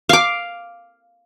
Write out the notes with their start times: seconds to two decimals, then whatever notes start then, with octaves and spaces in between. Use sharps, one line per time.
0.09 F5 D6